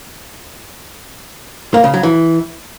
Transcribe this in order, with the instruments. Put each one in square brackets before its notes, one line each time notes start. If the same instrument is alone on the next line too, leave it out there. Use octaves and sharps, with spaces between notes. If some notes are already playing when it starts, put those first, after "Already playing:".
[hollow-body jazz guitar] A#3
C#3
F#3
E3